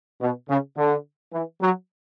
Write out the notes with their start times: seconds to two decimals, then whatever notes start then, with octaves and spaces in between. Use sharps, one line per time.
0.21 B2
0.49 C#3
0.77 D3
1.33 E3
1.61 F#3